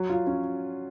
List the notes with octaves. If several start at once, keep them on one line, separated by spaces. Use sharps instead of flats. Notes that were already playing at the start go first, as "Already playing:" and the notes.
Already playing: F#3
F4
C#4